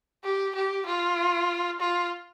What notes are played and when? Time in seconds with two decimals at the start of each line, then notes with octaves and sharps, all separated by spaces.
0.24 G4
0.55 G4
0.86 F4
1.80 F4